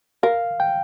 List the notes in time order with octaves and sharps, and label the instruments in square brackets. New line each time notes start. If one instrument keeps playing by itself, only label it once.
[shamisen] A#4 [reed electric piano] F5
[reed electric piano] G5